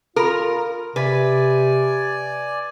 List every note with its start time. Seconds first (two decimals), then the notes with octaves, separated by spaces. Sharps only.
0.16 F4 A4 A#4 B5
0.96 C3 B4 D5 G#5